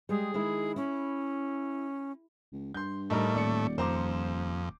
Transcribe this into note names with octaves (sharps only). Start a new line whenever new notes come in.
G3 G#3 G#4
D#3 G#3 E4
C#4 E4
C#2
G2 C6 G6
A2 G3 A3 D#4 A#4
D#1 D5 C#7
F2 C5 A#5 D6